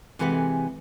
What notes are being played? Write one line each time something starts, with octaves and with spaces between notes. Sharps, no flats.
C3 E3 G#3 B4 F#5 G#5